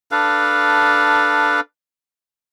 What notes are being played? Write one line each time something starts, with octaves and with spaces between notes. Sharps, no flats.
D4 A4 B4 F5